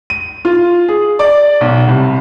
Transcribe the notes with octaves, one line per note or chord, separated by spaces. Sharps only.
D#7
F4
G#4
D5
B1
C2